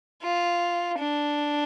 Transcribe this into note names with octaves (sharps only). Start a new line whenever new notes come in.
F4
D4